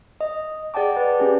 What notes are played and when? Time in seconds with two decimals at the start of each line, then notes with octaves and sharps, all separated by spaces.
0.21 D#5
0.74 G#4 D5 F#5 G5 A5 D6
0.97 B4 D5 A5
1.20 C#4 G4 G#4